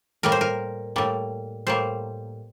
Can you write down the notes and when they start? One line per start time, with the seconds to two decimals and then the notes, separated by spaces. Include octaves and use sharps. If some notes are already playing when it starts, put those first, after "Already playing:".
0.23 A2 G3 A#3 A#4
0.32 C5
0.41 A#4
0.96 A2 G3 A#3
1.67 A2 G3 A#3 C5